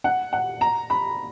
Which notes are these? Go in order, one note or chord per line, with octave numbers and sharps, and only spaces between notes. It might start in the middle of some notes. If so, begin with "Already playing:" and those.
F#5
F#5
A#5
B5